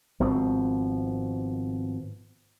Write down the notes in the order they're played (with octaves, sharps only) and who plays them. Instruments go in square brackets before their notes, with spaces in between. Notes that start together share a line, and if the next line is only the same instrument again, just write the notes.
[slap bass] G#1 B2 F3 C4